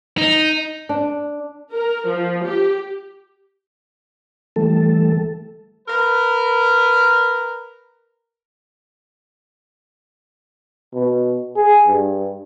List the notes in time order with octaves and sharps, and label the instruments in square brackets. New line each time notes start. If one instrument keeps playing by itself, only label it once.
[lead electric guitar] D#4
[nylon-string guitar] D4
[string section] A#4
F3
G4
[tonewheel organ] E3 G3 A3 A4
[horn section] A#4 B4
[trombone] B2
G#4
G2